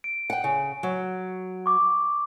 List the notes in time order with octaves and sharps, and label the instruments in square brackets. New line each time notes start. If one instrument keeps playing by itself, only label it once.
[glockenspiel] D7
[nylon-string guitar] F#5 G5
C#3
F#3
[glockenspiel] C#6 D6